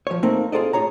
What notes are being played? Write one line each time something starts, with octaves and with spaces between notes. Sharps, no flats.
F3 C#5
A3 A#3 C4 D#4
F4 G#4 A4 C5 D5 D#5
A2 G#4 C#5 A#5